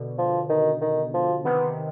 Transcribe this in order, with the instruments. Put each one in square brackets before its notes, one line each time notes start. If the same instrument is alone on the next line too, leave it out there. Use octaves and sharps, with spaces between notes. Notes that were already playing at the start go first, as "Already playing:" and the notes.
Already playing: [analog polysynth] B2 D3
[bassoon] F3
D#3
D#3
F3
[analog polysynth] C3 D#3 [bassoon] B3